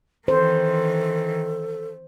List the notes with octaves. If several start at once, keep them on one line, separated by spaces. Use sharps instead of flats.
D#3 E3 A4 C5